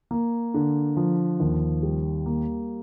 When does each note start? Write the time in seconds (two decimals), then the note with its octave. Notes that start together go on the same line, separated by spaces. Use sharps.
0.11 A#3
0.54 D3
0.97 F3
1.40 D#2
1.83 G3
2.26 A#3